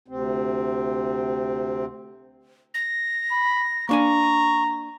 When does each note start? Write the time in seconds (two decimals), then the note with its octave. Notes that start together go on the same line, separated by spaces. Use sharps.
0.08 D2 C3 C4
2.74 A#6
3.31 B5
3.89 A#3 D4 G#5 A#5 C#6